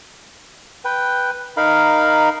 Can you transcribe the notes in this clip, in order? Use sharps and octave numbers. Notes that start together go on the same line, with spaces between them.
B4 G5
D#4 A#4 F5 B5